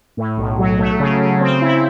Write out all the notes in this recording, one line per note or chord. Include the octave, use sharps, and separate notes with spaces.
A2
B1
F#3
A3
C#3
C#3
C4
E4